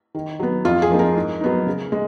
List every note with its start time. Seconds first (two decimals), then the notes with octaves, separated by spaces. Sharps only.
0.15 D#3
0.39 F#3 B3
0.65 F2 F4
0.82 G#4
0.90 F3 A#3 D#4
0.99 A#4
1.15 G#2
1.41 F#3 B3 D#4
1.67 C#3
1.92 G#3